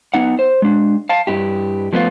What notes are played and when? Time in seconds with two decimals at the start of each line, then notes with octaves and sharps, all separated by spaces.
0.14 B3 D#4 F#5
0.39 C5
0.62 G#3 D4
1.09 F5 A5
1.27 G2 E4 G4
1.93 F3 A3 B3 D4 F4